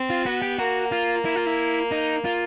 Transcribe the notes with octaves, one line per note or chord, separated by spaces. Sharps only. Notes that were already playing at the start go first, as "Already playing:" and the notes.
Already playing: C4
F4
B3 F#4
G4
A#3 F#4
F4
E4
F4
E4
D#4
F4